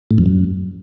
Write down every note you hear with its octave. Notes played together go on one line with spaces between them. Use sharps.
A2
F2
F#2